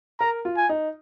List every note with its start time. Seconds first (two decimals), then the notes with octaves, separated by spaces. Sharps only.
0.20 A#4 A#5
0.45 F4
0.57 G#5
0.69 D#4